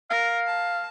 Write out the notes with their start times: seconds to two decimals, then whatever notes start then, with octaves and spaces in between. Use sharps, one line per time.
0.10 A#4 F5
0.47 A5